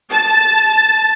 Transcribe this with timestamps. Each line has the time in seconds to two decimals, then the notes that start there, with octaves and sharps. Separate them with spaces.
0.12 A5